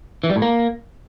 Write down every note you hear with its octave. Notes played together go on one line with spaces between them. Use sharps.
E3
G3
A2
A#3